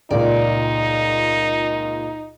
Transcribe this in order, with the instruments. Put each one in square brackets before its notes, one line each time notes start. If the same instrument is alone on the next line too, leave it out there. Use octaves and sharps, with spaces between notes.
[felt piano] C#2 A#2 [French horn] D#4 [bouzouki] D5